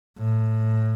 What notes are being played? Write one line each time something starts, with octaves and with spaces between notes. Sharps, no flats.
A2